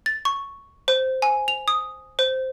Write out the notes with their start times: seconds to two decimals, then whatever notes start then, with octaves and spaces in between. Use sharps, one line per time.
0.06 A6
0.25 C#6
0.88 C5
1.22 G#5
1.48 F7
1.68 D#6
2.19 C5